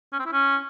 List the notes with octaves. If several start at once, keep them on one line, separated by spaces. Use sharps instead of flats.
C#4
C4
E4
C#4